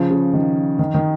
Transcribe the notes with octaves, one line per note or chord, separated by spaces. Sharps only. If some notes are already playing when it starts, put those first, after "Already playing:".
Already playing: C#3 F3
C#3
D#3
D#3
D#3